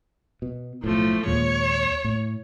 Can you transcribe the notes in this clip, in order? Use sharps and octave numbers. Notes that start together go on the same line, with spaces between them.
B2
B1 A2 F3 A3
D#2 A#2 G#3 C#5
A2